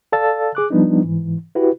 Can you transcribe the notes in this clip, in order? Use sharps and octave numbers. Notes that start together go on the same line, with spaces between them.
A4 D5 F5 A5 E6 A6
G#4 D6 F#6
F3 G3 B3 D4 D#4
G#2 E3
E4 F#4 G4 B4